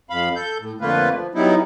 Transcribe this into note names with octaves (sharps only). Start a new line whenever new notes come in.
F2 F5 B5
A4 G6
A2
F2 D3 A3 A#3 F4 B4
F3
F#3 G3 B3 D#4 E4